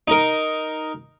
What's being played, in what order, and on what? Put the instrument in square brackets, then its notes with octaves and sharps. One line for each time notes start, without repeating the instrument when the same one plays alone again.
[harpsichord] D#4 A#4